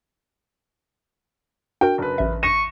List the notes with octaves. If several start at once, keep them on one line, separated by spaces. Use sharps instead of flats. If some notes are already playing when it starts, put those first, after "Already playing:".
D4 F#4 A#4 G5
F#1 B4
A1 E5
C#6 A#6 D#7 E7